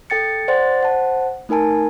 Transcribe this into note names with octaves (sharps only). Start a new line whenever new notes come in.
A4 G5 A6 C#7
C5 D5 F#5 C6 A6
C5 F#5 A5
A3 D#4 A#4 G#5 A5